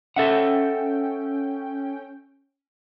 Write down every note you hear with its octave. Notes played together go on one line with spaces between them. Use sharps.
C#4 A4 E5 F#5 G5